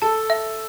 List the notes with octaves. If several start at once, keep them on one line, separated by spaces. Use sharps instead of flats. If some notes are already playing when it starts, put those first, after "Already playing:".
A4 A5
E5